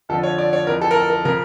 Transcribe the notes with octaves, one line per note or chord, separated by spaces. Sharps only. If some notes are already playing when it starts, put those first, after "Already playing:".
F2 D3 F3 A4
C#5
D5
C#5
F2 E3 A#4
A4
A#4
A4
A#4
C#3 F3 A#4